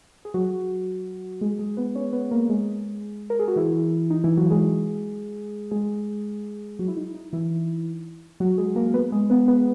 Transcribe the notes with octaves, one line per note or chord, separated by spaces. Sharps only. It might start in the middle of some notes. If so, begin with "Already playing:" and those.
G#4
F#3 F#4
G#3 G#4
G#3 G#4
B3 B4
C#4 C#5
B3 B4
A#3 A#4
G#3 G#4
A#4
G#4
F#4
E3 E4
D#4
E3 E4
F#3 F#4
G#3 G#4
G#3 G#4
F#3 F#4
E4
D#4
D#4
E3 E4
F#3 F#4
G#3 G#4
A#3 A#4
B3 B4
G#3 G#4
B3 B4
B3 B4